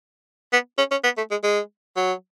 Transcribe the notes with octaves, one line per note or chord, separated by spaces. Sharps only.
B3
C#4
C#4
B3
A3
G#3
G#3
F#3